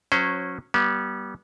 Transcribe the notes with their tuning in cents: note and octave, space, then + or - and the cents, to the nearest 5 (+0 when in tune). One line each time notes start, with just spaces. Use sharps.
F#3 -25 C#4 -10 C5 -35
G3 -20 B3 -35